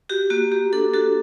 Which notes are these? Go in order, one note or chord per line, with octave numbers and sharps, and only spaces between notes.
F#4 G4
A#3 F#4
A#3 G4
D4 A4
F#4 A4